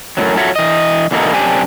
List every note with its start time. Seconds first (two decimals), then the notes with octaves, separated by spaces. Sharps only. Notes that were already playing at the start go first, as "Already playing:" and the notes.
0.17 F#2 A2 C3 F#3
0.36 F#3 F4 F#4 A4 C#5 E5
0.56 E3 D#5
1.11 E2 B2 D3 G#3 A#3 D#4
1.34 F#2 C3 D4 G4 G#5